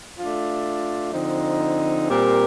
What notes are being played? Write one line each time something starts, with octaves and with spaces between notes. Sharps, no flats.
A3 D4 F4
D3 F3 C4 D#4
A#2 G3 C4 G4 A#4